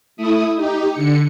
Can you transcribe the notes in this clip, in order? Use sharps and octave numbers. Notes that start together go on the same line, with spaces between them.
A3 E4 D#6
D#4 G4
D3 C#7